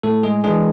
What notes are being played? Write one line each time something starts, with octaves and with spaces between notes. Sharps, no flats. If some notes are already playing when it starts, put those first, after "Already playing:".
A2 A3 A4
G#3 G#4
E3 G#3 D4 G#4